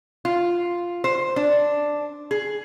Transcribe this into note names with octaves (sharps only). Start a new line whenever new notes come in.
F4
C5
D4
G#4